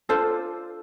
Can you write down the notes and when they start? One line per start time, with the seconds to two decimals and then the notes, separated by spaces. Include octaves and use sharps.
0.09 D4 F4 A4 C5